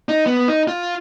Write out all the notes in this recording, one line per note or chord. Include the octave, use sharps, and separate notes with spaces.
D#4
B3
D#4
F4